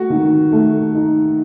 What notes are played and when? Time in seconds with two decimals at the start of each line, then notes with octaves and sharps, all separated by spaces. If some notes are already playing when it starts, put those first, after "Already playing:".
Already playing: A3 F#4
0.10 D#3
0.52 A3
0.95 D#4